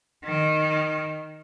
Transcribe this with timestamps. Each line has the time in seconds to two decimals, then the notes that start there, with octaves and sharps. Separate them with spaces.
0.25 D#3